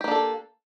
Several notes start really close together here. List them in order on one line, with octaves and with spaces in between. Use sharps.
G4 A#3 D4 A4